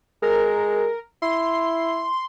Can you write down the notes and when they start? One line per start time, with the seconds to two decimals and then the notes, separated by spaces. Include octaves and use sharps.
0.22 G#3 A#4
1.22 E4 C6